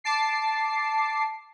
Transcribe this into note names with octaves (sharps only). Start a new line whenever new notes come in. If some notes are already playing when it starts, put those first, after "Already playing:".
A5 D6 C7